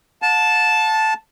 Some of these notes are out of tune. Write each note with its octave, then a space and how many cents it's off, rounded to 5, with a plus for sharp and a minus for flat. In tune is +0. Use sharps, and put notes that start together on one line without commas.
F#5 -45 A5 -5